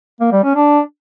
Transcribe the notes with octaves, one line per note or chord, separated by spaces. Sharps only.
A#3
G3
C#4
D4